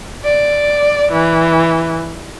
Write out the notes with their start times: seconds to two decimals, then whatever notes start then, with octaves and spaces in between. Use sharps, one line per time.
0.24 D5
1.12 E3